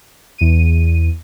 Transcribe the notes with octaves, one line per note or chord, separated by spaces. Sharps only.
E2 D#7